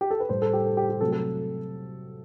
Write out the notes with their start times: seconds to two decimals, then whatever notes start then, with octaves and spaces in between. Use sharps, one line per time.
0.01 G4
0.11 A4
0.20 B4
0.29 A2 G3 C5
0.42 A4
0.53 G4
0.65 A4
0.77 G4
0.89 G4
1.01 C3 F#3 A3 A4
1.12 A4